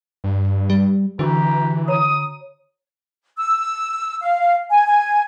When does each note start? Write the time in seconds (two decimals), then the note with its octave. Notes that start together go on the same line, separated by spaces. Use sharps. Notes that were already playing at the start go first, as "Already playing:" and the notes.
0.24 G2
0.70 G3
1.19 D3 E3 F#4 G4 B4 A#5 C#6
1.88 C#5 A#5 B5 D#6
3.37 E6
4.21 F5
4.70 G#5
4.87 G#5